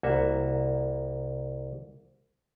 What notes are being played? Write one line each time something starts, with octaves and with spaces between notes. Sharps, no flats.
C2 A#3 F#4 E5